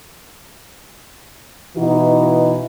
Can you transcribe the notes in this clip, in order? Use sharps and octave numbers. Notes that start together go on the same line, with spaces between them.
B2 E3 D#4 E4 F#4